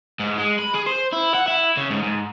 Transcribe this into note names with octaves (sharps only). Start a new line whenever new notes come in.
G#2
G#3
B5
G#4
C5
E4
F#5
E4
C#3
G#2
G#2